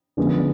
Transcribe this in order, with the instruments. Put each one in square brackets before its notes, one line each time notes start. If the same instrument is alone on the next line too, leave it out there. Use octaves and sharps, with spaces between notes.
[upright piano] F#2 D3 F3 G#3 B3